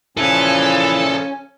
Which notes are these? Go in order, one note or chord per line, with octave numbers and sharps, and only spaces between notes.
A#2 C#3 E3 F3 C#4 A4 G#5